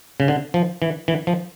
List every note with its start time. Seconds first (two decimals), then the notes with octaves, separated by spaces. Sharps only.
0.20 C#3
0.28 D3
0.54 F3
0.82 E3
1.08 E3
1.27 F3